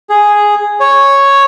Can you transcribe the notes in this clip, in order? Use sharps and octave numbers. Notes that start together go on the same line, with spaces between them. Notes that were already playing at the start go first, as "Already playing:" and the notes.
G#4
C#5